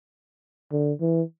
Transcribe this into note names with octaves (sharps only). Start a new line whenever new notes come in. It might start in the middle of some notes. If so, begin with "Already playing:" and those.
D3
E3